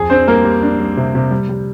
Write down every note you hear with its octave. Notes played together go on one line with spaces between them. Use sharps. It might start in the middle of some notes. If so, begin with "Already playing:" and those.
Already playing: F2 G#4
C4 D4 C5
G3 A#3 A#4
G3
D4
G3
C3
C3
G3
G3